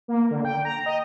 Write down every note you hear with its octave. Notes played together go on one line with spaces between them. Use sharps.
A#3
D3
G5
A#5
D#5